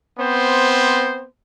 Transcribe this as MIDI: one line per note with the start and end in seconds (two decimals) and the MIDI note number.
0.19 1.26 59
0.19 1.26 60
0.19 1.26 72